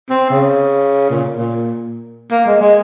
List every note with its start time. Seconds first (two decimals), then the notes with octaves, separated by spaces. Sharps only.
0.09 C4
0.30 C#3
1.10 A#2
1.37 A#2
2.31 A#3
2.46 G#3
2.61 G#3